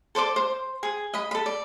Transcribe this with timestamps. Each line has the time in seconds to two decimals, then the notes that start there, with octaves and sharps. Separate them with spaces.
0.15 A4 C5 D5 D6
0.36 C5
0.83 G#4
1.14 D#5 B5
1.31 A4 B5
1.46 D5